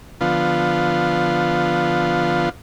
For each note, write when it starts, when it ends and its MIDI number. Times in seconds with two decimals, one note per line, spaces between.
0.21 2.49 50
0.21 2.49 53
0.21 2.49 59
0.21 2.49 65